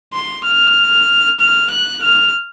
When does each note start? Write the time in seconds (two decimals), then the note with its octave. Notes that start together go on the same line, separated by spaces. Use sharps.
0.13 C6
0.45 F6
1.40 F6
1.71 F#6
2.02 F6